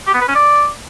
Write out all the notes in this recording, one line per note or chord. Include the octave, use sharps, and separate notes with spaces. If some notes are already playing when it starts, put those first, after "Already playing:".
G4
B3
B4
C#4
D5